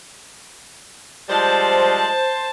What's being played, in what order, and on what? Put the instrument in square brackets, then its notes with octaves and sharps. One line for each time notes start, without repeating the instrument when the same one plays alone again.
[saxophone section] F3 G3 G#3 [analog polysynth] C5 [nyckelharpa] A5